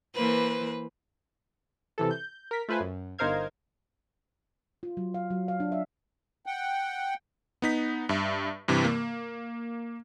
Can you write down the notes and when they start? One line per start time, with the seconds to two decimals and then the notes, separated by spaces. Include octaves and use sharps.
0.15 E3 A#3 B4 C5
1.98 C3 E3 A4
2.11 G6
2.51 A#4 B6
2.68 A3 F4 B4 C5 G#5
2.80 F#2
3.19 G1 D#4 A#4 C5 F5 G#6
4.83 F4
4.97 F#3
5.14 F5
5.30 F#3
5.48 F5
5.60 D4
5.72 E5
6.46 F#5 G5
7.62 B3 D#4 B6
8.09 G2 E5
8.68 G2 C3 E3
8.85 A#3